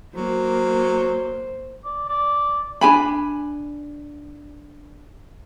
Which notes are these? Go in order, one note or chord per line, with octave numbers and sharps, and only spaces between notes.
F#3 A#3 C5
D5
D5
D4 G4 G#5 B5